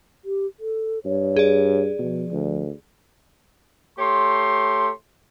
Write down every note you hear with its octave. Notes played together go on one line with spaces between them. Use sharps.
G4
A4
G2 C#5
G#4 D5
B2 F3
D2
A3 G4 C#5 C6